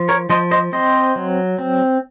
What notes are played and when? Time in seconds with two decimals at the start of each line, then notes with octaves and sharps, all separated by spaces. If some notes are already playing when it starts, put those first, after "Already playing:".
Already playing: F3
0.09 A#4 C#5
0.30 F3 C5 D#5
0.51 C5 D#5
0.72 C4 C5 D#5
1.16 F#3
1.59 C4